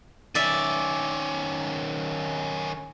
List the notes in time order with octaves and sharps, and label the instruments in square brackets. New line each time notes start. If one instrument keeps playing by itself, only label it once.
[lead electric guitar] D#3 C#4 [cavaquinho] D5 E5